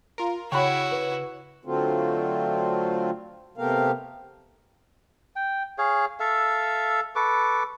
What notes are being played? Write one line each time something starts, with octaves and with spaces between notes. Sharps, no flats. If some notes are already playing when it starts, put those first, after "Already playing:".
F4 A#4
C#3 E4 F#4 C#5 F#5 G5 B5
B4
D3 F#3 A3 C4 F4
C3 A3 B3 G4 A#4 F5
G5
G#4 C#5 F5
A4 E5 F5
A4 B4 C#6 D6